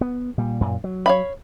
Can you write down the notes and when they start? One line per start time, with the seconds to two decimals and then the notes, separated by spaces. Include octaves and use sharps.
0.01 B3
0.38 A#2 G3
0.61 F#2 A#2
0.84 F#3
1.06 C#5 F5 B5